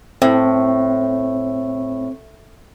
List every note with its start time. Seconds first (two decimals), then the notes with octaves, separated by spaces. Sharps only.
0.22 A2 C4